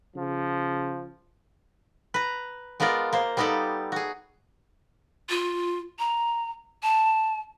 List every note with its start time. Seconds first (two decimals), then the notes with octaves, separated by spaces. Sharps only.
0.16 C#3 F3
2.14 B4 A#5
2.80 G#3 B3 F4 A#4 D5
3.13 A#3 C5
3.37 G3 B3 D#4 G4 A4 D5
3.92 F#4 G#4
5.30 F4
5.99 A#5
6.83 A5